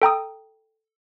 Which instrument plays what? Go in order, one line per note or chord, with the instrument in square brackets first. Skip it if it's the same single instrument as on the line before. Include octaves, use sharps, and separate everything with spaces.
[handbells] A4 G5 A#5 D#6